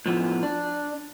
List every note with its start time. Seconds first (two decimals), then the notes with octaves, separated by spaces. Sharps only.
0.06 A2 F3 B3
0.43 D4